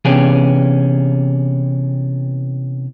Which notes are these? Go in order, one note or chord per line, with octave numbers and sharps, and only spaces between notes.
C3 E3 B3 C#4 G4 G#4